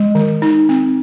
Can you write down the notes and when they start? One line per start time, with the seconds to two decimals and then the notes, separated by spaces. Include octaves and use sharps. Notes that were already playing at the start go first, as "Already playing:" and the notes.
Already playing: G#3
0.15 D#3
0.42 D#4
0.69 C4